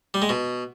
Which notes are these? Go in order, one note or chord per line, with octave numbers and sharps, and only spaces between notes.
G3
G#3
B2